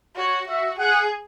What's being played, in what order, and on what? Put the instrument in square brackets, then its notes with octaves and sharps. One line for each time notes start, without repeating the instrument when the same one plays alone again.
[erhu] F#4 [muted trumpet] C#5
[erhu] F#4 [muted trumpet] E5
[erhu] G#4 [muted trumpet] F#5